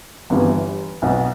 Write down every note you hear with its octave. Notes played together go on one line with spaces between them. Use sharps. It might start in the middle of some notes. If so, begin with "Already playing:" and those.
G1 G2 E3 G3
B1 B2 B3